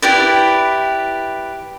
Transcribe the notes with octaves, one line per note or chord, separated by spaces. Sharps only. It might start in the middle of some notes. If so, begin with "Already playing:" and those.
E4 G4 B4 D5